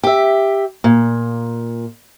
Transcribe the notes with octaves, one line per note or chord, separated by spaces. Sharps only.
G4 E5
A#2